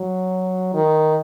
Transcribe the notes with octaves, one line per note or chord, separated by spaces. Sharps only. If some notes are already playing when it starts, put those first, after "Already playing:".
Already playing: F#3
D#3